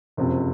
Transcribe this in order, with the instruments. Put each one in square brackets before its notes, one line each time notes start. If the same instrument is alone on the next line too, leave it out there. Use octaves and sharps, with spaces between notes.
[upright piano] F#1 F2 C3